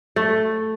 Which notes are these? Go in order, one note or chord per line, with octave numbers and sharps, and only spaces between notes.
A3